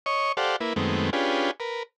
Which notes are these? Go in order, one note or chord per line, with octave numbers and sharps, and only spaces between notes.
C#5 D#5 C#6
G4 A4 C5 D5 F5 F#5
A#3 E4 B4
F#2 D#3 G#3 A3 B3 C4
C#4 D4 F4 G4 G#4 B4
A#4 B4